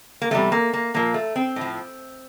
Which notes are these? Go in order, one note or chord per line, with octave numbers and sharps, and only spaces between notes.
A#3
E2 C3 G3 A3
A#3
A#3
A#2 F3 A#3
A3
C4
A2 F3